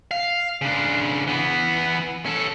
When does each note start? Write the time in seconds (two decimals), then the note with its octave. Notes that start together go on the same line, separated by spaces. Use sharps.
0.11 F5
0.62 C#3 D4
1.27 E3 B3
2.26 C#4 A4